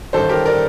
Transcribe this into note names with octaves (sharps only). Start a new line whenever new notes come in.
A1 G2 D#3 A4 C5
G4 A#4
A#4 D5